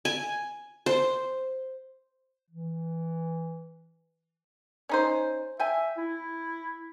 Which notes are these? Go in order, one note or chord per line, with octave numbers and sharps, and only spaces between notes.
G#5
C5
E3
C#4 D#4 C5
E5 G5 G#5
E4